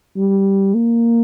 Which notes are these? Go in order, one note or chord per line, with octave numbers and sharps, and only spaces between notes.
G3
A#3